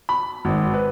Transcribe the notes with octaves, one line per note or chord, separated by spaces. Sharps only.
B5
G#1
B4